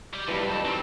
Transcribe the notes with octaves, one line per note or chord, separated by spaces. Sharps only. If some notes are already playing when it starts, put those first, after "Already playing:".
G3 D5
F2 E3 G3 D4 B4
D#4 A4
F#3 G3 C4